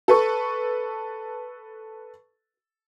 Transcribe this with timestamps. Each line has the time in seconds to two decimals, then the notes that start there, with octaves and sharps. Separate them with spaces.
0.08 A4 B4 C#6